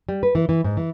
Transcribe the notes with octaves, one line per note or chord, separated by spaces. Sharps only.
G3
B4
E3
E3
G#2
E3